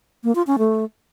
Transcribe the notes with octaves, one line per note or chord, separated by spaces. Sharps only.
A#3
F4
C#4
A3